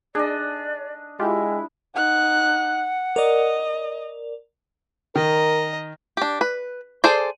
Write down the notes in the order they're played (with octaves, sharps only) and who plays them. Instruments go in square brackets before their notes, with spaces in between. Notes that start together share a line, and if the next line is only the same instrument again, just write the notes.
[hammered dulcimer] D4 D#5 [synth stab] G#4 [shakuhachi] D5
[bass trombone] G#3 [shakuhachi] E4 [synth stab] F4 G4
[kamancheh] D#4 F#6 [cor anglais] F#5
[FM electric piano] A#4 D5 [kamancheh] D#5
[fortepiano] D#3 [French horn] A#4 [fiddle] D#5 A#5
[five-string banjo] D4 G4
B4
G#4 A4 C5 D5